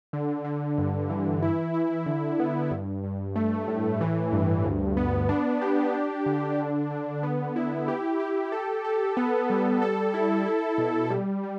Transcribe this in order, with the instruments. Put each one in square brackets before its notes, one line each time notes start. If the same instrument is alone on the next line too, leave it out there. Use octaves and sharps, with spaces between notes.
[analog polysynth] D3
D3
G2
E3
E4
E4
D3
B3
G2
G2
A3
A2
E3
G2
D2
B3
D4
G4
D4
D3
D3
D3
B3
E4
G4
G4
A4
A4
B3
G3
A4
E4
E4
B2
G3
G3